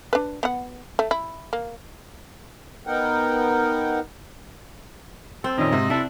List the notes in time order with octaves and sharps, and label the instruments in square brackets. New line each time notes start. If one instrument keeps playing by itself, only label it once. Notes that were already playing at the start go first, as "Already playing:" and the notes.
[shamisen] D4 B4
B3 F#5
A3
E4
A#3
[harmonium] B3 D#4 A#4 F#5 G5
[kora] C4 [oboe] A4
[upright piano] A#1 F2 [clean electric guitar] D#3 C#4 [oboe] D#5
[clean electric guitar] G#2 [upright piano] C3
[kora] D4 [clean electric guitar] E4 [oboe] A4